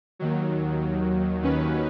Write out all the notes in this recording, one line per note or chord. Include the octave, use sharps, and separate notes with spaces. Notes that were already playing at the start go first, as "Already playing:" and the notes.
D#2 D#3 F#3
D#2 D#3 F#3 C#4 B4